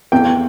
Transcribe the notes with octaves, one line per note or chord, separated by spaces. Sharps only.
E2 G5